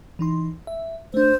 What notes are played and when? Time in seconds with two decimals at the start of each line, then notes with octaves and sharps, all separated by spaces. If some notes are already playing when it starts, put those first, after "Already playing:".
0.19 E3 D#4 C6
0.67 E5
1.14 A3 D4 C5